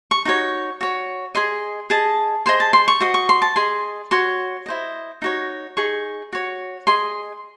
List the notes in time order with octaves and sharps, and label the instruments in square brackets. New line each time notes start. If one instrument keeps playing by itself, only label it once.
[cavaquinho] C#6
D#4 F#4 C#5
F#4 C#5
G#4 D#5 C6
G#4 D#5 A5
G#4 C5 D#5 C6
A5
C6
C#6
F#4 C5 D#5 D#6
C#6
C6
A5
G#4 D#5 C6
F#4 C#5 C6
E4 C5 D#5
D#4 F#4 C#5
D#4 G#4 C#6
F#4 C#5
G#4 D#5 C6